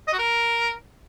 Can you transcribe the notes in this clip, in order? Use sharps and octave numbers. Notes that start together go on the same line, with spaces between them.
D#5
F#4
A#4